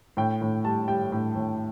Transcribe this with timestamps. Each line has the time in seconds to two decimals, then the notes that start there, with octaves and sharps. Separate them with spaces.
0.17 A2 G5
0.41 A2
0.64 G3 A5
0.88 G3 G5
1.12 A2
1.35 A2